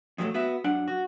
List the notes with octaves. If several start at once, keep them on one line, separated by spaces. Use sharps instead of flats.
F2 A#2 F#3 G#3 A3
B3 F#4 E5
F#2 D4 F#5
F#4